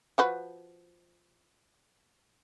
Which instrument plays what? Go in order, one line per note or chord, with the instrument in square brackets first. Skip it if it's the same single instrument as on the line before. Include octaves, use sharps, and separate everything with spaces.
[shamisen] F3 F#4 B4